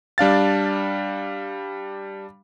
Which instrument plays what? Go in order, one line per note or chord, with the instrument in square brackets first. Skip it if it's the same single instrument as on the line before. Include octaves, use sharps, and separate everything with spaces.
[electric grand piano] G3 D4 F5 A6